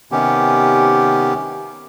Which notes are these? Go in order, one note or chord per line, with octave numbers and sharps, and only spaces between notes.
C3 D#3 B3 C#4 G4